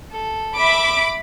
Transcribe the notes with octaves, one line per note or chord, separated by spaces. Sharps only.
A4
E5 B5 D6